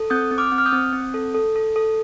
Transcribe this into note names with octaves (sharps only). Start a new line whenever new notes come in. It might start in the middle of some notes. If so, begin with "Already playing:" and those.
Already playing: A4
C4 D#6 G6
C4
D6 F6
C4
F6
D#6 G6
C4
C4
A4
A4
A4
A4